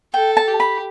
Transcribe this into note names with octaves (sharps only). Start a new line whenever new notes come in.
A4 G5
A5
G4
B5